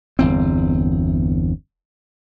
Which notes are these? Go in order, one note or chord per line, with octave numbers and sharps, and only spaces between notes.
G1 E2 C4